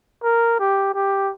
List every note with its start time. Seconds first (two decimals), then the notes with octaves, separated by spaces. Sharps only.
0.23 A#4
0.59 G4
0.95 G4